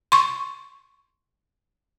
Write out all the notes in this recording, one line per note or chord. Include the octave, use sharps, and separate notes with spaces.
C6 C#6